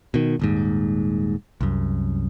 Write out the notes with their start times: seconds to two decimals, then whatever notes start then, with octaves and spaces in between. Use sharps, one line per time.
0.14 B2 D#3
0.39 D#1 D#2 G#2
1.61 C2 F#2